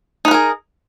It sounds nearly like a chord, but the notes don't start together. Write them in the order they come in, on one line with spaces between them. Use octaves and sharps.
D#4 B4 A#4 G#4